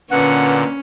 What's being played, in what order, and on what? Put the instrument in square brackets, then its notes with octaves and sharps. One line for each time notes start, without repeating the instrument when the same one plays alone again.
[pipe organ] A#2 D3 [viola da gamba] C#4 [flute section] B4 [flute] F#5